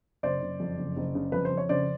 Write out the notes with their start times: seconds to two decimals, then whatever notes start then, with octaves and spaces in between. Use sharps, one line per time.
0.23 F#1 C5 D5
0.42 F#1
0.60 F2
0.79 F#1
0.96 F#1
1.15 C#3
1.32 F2 B4
1.45 C5
1.51 F2
1.57 C#5
1.69 C#3 C5 D5